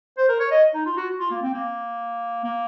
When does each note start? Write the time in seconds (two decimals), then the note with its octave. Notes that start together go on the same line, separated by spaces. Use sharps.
0.18 C5
0.29 A#4
0.40 C#5
0.51 D#5
0.74 D#4
0.86 F4
0.97 F#4
1.20 F4
1.31 A#3
1.42 C4
1.54 A#3
2.44 A#3